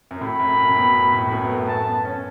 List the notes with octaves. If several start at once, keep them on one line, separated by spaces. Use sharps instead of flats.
F#2
A2 B5
F#2
F#2
A2
B2
A2
A2
F#2
B3
A3
B3 A5
B3
C#4